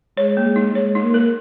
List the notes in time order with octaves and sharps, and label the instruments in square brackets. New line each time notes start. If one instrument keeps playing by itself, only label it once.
[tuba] G#3 [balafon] C#5
[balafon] A#3
[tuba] G#3
[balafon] D#4
[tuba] G#3 [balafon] C#5
[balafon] D#4
[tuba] A#3
[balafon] A#4